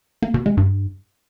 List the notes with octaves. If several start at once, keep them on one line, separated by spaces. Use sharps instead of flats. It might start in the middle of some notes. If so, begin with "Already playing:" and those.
A#3
B2
G#3
G2